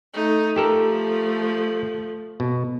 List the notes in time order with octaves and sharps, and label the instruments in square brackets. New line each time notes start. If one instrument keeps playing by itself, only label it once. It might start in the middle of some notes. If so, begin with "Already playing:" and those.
[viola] A3 D#4
[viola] F3 A3 [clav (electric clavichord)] G4 A4 A#4
[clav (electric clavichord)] B2